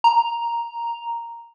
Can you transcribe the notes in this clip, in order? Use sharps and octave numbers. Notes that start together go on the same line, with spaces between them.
A#5